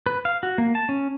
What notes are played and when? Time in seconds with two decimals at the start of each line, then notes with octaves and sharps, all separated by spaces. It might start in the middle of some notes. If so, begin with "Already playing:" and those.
0.06 B4
0.25 F5
0.43 F#4
0.58 A#3
0.75 A5
0.89 C#4